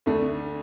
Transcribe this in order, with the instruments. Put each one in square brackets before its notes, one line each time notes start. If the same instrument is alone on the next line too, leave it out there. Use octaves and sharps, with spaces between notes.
[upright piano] D2 D3 A3